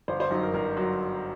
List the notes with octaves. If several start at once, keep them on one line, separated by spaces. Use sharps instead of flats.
G1 C5
C5
F#2 D#4
A#4
G1 A#4
F#3